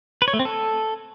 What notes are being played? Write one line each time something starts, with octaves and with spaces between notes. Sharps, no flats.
B4
C#5
A3
C4
A4